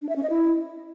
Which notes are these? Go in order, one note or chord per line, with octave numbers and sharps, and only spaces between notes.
D4
E5
C#4
D#5
E4